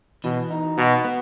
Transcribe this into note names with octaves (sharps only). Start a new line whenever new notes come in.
B2 E3
D#4
B2 F#4
B3